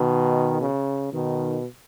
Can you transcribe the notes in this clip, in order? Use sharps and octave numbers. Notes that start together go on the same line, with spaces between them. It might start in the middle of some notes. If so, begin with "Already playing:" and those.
Already playing: B2 D#3
C#3
B2 D#3